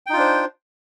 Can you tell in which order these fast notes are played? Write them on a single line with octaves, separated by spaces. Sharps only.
G5 D#4 F4 D4 C5